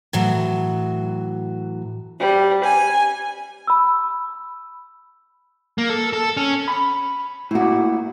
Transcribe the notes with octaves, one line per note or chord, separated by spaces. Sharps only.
A2 E3 F#3
G3
G#5
B5 E6
A#3
A4
A4
C#4
B5
A2 A#3 E4 F#4